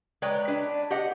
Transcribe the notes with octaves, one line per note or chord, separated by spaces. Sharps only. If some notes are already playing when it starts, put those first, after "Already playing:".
G#3 B4 C#5 D5 G5 A#5
D4 B4
G4 D#5 F#5